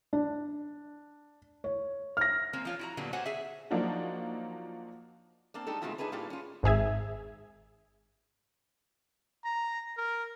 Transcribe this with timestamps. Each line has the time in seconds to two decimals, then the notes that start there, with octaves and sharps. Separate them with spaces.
0.13 D4
1.64 C#5
2.17 F6 A#6
2.53 E3 G#3 A#3 C4
2.65 F3 F4 C#5
2.79 E4 F#4 A#5
2.97 A#2 D3 F#3 G3 B3
3.13 F#4 G4 C5 C#5 F#5 G#5
3.26 G#4 E5
3.71 F3 F#3 A#3 D4 D#4 F#4
5.54 A#3 C4 D4
5.67 G3 G#3 D#4 A4
5.82 B2 G#3 A3 C4 F4 F#4
5.98 D4 D#4 G#4 B4 C#5
6.12 A2 G3 A#3 F4
6.30 C#4 F4
6.63 G#1 G#2 G#4 E5 G#6
9.45 A#5
9.97 A#4